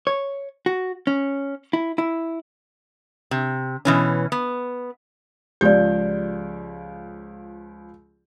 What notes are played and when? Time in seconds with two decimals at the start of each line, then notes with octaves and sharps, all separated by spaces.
0.07 C#5
0.66 F#4
1.07 C#4
1.73 E4
1.98 E4
3.31 C3
3.85 B2 E3 C#4
4.32 B3
5.61 C#2 F3 G4 D5 G6